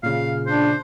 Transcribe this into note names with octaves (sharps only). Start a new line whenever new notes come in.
A#2 C#3 F5
D4 C5